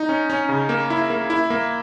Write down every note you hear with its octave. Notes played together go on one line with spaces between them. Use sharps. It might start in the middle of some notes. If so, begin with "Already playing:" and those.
Already playing: D#4
C#4
C#4
C#3
A#3
E4
A#3
E4
A#3